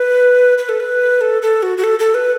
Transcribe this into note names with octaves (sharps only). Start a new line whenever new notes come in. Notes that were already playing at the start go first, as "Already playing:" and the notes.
Already playing: B4
B4
A4
B4
A4
A4
F#4
F#4
A4
A4
B4